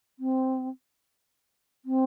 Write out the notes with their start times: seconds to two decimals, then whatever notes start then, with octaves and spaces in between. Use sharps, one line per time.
0.19 C4
1.85 C4